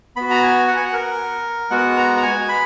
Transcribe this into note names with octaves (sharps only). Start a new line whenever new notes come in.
B3 F#4 B5
A#5
G#5
F#5
G#5
F#5
A#4
G#3 B3 F#4 F#5
A#5
F#5
G#5
B5